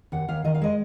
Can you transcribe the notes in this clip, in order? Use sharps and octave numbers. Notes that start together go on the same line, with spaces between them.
D#2 F#5
D#2 F5
D#3 D#5
F5
G#3 D#5